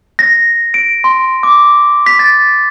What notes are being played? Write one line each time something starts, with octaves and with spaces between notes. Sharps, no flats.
A#6
D7
C6
D6
B6
A6